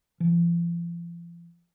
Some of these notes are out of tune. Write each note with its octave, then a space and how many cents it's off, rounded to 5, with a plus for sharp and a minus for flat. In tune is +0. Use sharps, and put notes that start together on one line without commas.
F3 -40